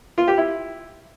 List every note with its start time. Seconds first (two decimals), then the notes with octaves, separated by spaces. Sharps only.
0.18 F4
0.28 G4
0.38 E4